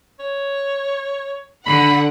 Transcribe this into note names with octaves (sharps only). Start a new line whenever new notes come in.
C#5
D3 F#5 B5